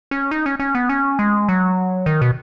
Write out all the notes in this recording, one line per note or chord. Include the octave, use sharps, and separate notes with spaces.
C#4
D#4
C#4
C#4
B3
C#4
G#3
F#3
D#3
B2